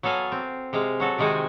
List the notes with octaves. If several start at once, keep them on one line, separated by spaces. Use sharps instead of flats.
F#3 B3 A4 F5 G#5
C4
C3 G#3 F5
F#3 F#4 A4
C3 D#3 G#3 F#4 G5 G#5